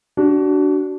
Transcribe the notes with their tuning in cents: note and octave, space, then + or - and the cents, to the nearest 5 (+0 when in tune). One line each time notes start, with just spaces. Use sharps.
D4 -10 F#4 +20